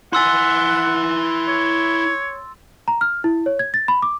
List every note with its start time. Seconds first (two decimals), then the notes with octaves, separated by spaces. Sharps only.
0.13 E4 F#5 G#5 C6 E6 A6
1.48 C#5
2.88 A#5
3.01 F6
3.24 E4
3.46 C#5
3.59 G#6
3.74 A6
3.88 B5
4.02 D6